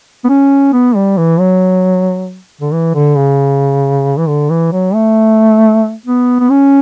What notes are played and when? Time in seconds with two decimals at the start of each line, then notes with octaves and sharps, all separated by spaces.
0.25 B3
0.29 C#4
0.73 B3
0.96 G3
1.18 E3
1.40 F#3
2.61 D3
2.73 E3
2.95 D3
3.18 C#3
4.18 E3
4.28 D3
4.50 E3
4.73 F#3
4.94 A3
6.06 B3
6.40 B3
6.50 C#4